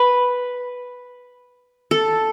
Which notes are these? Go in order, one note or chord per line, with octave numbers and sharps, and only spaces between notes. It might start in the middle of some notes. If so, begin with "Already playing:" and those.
Already playing: B4
A4